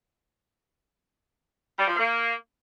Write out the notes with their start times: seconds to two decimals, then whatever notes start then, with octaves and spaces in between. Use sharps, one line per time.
1.79 G3
1.88 F3
1.97 A#3